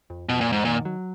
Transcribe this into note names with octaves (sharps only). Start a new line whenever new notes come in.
F2
F2 B2
A#2
F2 G#2
A#2 D#3
F#3